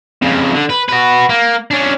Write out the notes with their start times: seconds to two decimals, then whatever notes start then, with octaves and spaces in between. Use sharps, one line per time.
0.22 F2 C#3
0.55 D3
0.70 B4
0.89 F#4 B4
1.29 A#3
1.71 C#4 D4